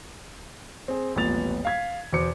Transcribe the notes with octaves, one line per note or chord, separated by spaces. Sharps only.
C4 G#4
D#1 A1 A#2 B3 A6 F7
F5 G#6 B6
E2 B2 C5 D6 C#7